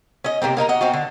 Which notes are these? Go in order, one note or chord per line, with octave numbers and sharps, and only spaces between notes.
C#4 D#5
C3 E3 A#3 C4
A#3 D#4 A4 A#4
F#4 D#5
C4 D#4 F4 F#4
D3